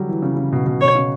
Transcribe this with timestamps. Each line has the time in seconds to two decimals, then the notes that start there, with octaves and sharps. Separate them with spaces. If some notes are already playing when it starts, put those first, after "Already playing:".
Already playing: D3 F#3 G3
0.09 E3
0.22 C#3
0.37 C#3
0.53 B2
0.66 B2
0.81 B2 C#5
0.95 C#3